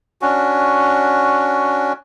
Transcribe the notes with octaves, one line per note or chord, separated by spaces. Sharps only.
C#4 D4 F#4